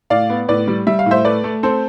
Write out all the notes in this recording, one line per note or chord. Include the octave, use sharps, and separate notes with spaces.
A2 D5 F5
B3
A2 B4 D5
G3
G3 E5
F5
A2
C5 E5
A3 B4 D5
A3
C4 A4 C5